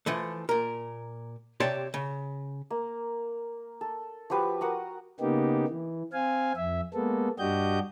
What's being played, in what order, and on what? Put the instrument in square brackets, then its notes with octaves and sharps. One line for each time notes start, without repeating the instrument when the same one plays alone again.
[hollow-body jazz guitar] E3 F3 A3
A#2 A#4
C3 G4 C#5 D5 A5 C6
C#3
[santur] A#3
A4
F3 F#4 G4 B4
F#4 A#4 F#5 D#6
[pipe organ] C#3 A#3 B3 D#4 G4
E3
C4 F5 G#5
F2 E5
G#3 A#3 B3 A4
G2 D4 F#4 G4 D#5 G6